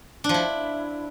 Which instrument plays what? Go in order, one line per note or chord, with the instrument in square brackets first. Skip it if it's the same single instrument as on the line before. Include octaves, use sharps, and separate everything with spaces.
[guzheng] D4
F3
E4